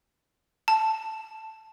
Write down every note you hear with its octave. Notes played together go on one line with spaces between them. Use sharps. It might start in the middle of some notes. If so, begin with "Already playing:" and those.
A5